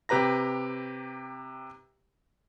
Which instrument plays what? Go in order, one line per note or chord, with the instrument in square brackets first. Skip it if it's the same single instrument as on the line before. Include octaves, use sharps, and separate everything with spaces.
[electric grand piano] C3 G4 B4 A#5 A#6